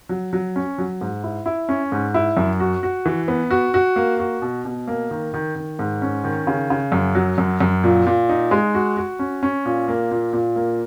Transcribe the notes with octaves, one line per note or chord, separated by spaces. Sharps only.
F#3
F#3
C#4
F#3
G#2
E4
E4
C#4
G#2
E4
F#2
F#4
F#4
E3
B3
F#4
F#4
A#3
F#4
B2
B2
A#3
D#3
D#3
D#3
G#2
C#4
D#3
C#3
C#3
F#2
F#3
F#2
F#2
A#2
A#2
D#4
G#3
F#4
F#4
C#4
C#4
A#2
A#3
A#2
A#2
A#3